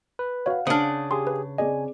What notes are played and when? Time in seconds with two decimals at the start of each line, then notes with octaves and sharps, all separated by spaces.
0.19 B4
0.46 F#4 C#5 F5 F#5
0.67 C#3 D4 C5 D#6 F6
1.11 G4 G#4 C6
1.27 B4
1.58 C4 G#4 D5 D#5 G#5